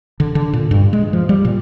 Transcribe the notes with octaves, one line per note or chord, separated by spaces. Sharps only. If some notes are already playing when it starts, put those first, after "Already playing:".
D3
D3
A#2
G2
G#3
F3
G3
A#2